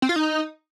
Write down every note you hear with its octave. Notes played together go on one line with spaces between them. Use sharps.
C4
F4
D#4